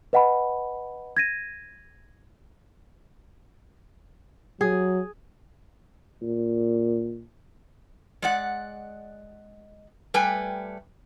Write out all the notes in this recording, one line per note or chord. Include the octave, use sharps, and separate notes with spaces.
B4 D#5 F#5 G#5 B5
G#6 A#6 D#7
F#3 G#4
A#2
G#3 D5 F#5
G3 A3 B4 G5 G#5